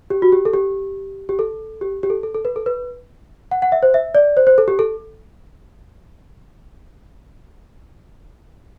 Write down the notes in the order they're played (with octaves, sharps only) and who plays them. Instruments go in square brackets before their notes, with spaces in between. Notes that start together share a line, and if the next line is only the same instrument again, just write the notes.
[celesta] G4
F#4
G4
A4
G4
G4
A4
G4
G4
A4
A4
A4
B4
A4
B4
F#5
F#5
E5
C5
E5
D5
C5
C5
A4
G4
A4